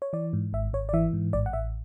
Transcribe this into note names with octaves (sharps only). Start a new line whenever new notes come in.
C#5
E3 D5
G#2
G#1 E5
G#1 C#5
D5
E3 E5
G#2
A1 D5
F#5
A1 E5